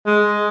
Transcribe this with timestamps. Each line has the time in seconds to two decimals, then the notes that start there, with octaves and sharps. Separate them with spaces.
0.06 G#3